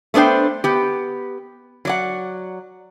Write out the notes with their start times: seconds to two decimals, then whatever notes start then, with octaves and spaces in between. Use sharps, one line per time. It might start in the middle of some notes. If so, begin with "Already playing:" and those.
0.14 A3 B3 D4 C5 G5
0.64 B3 G4
1.85 F#3 D5 F#5